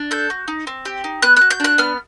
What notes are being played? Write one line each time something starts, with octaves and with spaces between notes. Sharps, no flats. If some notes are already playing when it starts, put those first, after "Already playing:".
Already playing: D4
A4 G6
F#4
D#4
C4
G4
D#4
B3 F#6
F#4 F#6
G6
D4 F#6
B3 F6